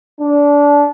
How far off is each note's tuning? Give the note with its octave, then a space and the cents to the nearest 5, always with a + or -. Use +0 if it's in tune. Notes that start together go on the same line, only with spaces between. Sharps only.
D4 -20